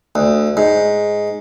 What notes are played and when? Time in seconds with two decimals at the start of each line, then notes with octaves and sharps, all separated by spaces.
0.15 D2
0.57 G#2